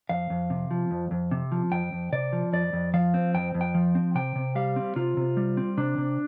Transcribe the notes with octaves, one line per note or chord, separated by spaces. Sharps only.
F2 F5
F2
C3
F3
F2
F2
C3
F3
F2 G5
F2
C3 D5
F3
F2 D5
F2
F3 F5
C4
F2 G5
F2
G5
F3
C4
C3 G5
C3
G3 F5
C4
C3 F4
C3
G3
C4
C3 D4
C3